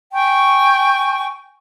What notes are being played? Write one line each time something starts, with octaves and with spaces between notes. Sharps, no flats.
G5 G#5 C#6